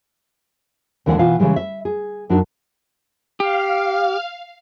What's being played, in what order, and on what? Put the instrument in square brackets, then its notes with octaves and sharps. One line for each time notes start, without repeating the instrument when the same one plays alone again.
[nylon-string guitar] D#2 D3 E3 G#3 D5 F#5
B2 E3 F4 F5
C#3 E3 G3 G#3
E5
G#4
F#2 D4 D#4 F#4 D5
[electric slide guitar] G4 [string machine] F5